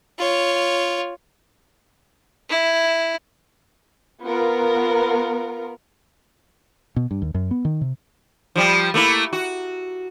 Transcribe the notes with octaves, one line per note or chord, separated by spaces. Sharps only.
F4 C#5
E4
B3 F4 A#4
B2
G2
D#2
F#2
B3
D#3
C3
F3 G3
A3 A#3 E4
F#4